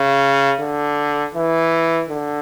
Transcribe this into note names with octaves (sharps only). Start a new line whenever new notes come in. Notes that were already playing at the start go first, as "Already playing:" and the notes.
Already playing: C#3
D3
E3
D3